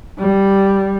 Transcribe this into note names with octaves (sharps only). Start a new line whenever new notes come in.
G3